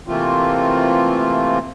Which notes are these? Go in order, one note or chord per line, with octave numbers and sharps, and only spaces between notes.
C3 E3 A3 A#3 C4 F4